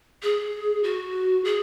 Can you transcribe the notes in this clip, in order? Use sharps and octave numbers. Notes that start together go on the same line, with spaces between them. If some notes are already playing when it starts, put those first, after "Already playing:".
G#4
F#4
G#4